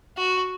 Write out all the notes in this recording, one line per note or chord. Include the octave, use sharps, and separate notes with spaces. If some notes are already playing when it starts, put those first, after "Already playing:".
F#4